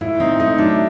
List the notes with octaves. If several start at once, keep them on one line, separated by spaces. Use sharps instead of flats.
A2 E4
C4 D#4
A3 D#4
F#3 D4